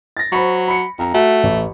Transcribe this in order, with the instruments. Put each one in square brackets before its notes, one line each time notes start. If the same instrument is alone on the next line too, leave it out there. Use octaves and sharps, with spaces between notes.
[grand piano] A6 A#6
[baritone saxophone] F#3 [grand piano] C5 B5 C#6
[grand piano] B5 C#7
[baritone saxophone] F2 [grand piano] A#5
[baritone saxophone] A3 [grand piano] F#4
[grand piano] A1